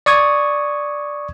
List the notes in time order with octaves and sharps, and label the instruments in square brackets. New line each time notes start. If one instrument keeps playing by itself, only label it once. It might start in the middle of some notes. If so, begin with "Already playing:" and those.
[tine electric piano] D5 C#6 D#6 G#6